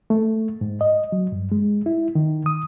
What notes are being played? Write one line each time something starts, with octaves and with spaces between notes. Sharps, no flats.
A3
G#2
D#5
F#3
G2
G#3
E4
D#3
D#6